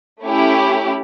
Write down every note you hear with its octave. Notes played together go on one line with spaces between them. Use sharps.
A3 C#4 E4 G4